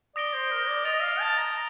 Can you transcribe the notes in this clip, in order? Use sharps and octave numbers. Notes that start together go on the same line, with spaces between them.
D5 D#6 A#6 D7 G7
C5
A#4
D5
D#5 D#6 A6 D7 F7
F5
A5
A#5